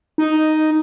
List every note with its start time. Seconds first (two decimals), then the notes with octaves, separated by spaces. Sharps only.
0.18 D#4